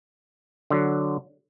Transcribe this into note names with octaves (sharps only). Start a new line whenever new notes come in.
D3 F#3